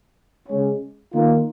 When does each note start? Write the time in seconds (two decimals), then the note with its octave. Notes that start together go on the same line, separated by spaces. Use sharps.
0.48 C#3 G#3 C#4
1.11 D#3 A#3 F4 A#4